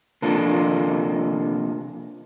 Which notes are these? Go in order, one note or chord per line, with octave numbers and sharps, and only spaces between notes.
C3 F3 A#3 D4 A4